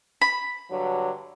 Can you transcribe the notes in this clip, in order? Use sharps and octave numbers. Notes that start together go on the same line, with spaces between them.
B5
G2 D3 F#3